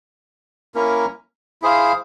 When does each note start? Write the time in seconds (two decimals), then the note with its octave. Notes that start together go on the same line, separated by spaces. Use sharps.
0.74 A#3 C#4 E4 A#4
1.62 E4 G#4 C5 F5